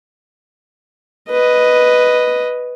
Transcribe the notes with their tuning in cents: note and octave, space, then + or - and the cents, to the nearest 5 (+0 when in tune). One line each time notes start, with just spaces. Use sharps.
B4 +0 D#5 +0